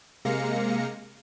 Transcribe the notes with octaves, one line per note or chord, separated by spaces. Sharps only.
C3 G#3 A#3 F5 A#6 C#7